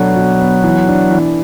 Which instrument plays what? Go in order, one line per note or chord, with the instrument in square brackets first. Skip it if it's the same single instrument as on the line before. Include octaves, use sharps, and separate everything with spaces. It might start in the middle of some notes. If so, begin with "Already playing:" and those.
Already playing: [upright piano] B2 B3 D4 A4 [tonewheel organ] F#3
[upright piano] B2
B3
E3
D4
E3